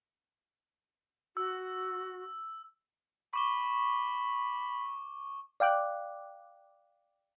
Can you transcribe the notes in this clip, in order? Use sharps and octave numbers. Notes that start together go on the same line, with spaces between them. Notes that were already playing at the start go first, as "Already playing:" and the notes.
F#4 E6
B5 C#6 D6 G7
D5 F5 G5 D6 F#6